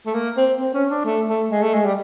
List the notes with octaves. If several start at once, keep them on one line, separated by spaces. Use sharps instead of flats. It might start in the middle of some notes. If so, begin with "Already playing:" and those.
A3
A#3
C4
C4
C#4
D4
A3
A3
G#3
A3
G#3
G3